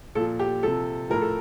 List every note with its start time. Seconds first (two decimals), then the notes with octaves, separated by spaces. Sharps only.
0.15 A#2 F3 A4
0.39 G4
0.63 C3 F3 A4
1.10 A2 F3 A#4
1.21 A4